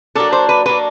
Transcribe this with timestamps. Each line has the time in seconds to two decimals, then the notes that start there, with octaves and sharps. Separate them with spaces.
0.15 F#3 A#3 D4 A4
0.33 C5
0.49 B4
0.66 F#3 A#3 D4 B4